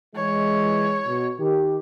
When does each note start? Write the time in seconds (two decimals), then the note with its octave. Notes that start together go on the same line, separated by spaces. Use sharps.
0.15 E3 G#3 C#5
1.07 B2
1.39 D#3 G4